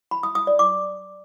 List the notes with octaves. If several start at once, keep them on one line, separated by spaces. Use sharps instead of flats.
B5
D#6
D#6
D5
D6